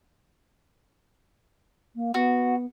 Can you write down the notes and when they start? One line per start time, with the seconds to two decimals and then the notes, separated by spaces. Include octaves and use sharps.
1.96 A#3
2.14 B3 F#4